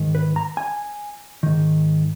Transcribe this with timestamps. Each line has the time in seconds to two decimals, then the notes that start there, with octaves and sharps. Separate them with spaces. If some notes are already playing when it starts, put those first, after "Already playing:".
Already playing: G#2 D#3
0.15 B4
0.36 A#5
0.57 G#5
1.43 G#2 D#3